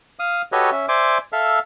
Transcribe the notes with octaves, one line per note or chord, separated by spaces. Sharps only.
F5 D#6
F#4 G4 A4 B4 C#5 D#5
C#4 E5
C5 D5 E5 G#5 C6 D6
A4 E5 F5